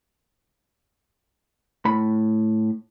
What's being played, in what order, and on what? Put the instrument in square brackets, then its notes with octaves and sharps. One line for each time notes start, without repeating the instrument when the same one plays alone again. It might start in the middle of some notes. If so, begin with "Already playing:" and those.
[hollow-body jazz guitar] A2 B5